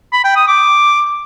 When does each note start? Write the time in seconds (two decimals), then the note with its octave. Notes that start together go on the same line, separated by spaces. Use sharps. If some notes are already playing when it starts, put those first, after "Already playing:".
0.13 B5
0.24 G5
0.36 D#6
0.48 D6